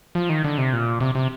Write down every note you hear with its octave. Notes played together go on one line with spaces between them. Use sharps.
F3
D#3
D3
C3
A#2
C3
C3